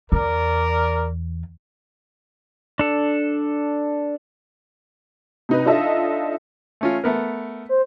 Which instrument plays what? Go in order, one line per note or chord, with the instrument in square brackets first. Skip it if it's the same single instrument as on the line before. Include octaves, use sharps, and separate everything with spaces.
[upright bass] E2 [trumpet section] A#4 D5
[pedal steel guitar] D4 A4
[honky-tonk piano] C3 D#4 B4
D4 D#4 F4 A4 D#5 E5
[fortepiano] A3 C#4 F4
A3 B3 A#4
[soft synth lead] C5